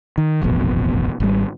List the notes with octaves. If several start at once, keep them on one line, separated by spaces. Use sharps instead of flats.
D#3
D#1 A1 F2 B2
G#1 G3